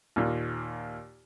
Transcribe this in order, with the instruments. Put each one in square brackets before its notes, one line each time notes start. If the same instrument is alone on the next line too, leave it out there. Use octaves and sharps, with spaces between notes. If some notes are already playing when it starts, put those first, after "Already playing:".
[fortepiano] D#2 A#2